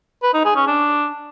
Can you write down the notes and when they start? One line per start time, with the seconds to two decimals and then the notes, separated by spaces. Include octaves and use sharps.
0.23 B4
0.34 D#4
0.45 G#4
0.56 C#4
0.67 D4